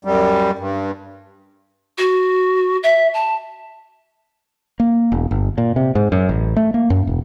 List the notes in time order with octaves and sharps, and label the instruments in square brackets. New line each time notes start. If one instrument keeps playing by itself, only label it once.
[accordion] F#2 G3
G2
[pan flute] F#4
E5
A5
[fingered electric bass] A#3
E1
G1
A#2
C3
G#2
F#2
A1
A3
A#3
F#2
E1